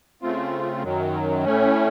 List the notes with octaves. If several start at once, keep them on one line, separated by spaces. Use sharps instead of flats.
C#3 A3 C4 F4
F#2 D#3 F#3
A2 A3 C#4